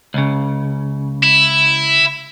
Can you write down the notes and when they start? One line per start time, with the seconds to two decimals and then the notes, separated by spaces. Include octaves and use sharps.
0.14 C#2 C#3
1.24 E4